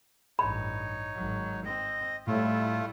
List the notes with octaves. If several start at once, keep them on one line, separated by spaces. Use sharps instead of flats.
A1 G2 D#4 C#5 B5
G#1 F#3
C4 D#5
A2 G3 A3 E4 F4